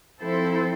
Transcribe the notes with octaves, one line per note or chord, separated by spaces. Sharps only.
F3 C4 E4 A4 C5